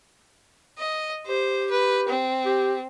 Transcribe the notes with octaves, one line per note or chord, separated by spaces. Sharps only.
D#5
G4 C5
B4
C4
G4